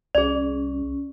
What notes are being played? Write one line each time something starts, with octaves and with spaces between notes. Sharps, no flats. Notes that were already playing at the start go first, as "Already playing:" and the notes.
C2 C#4 G#4 D5